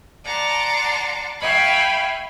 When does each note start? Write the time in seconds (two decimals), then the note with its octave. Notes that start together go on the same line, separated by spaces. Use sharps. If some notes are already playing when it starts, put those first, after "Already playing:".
0.24 D5 F#5 A5 A#5 C6
1.40 E5 F5 G5 G#5 B5 C#6